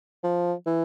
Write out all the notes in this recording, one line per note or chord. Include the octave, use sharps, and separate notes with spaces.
F3
E3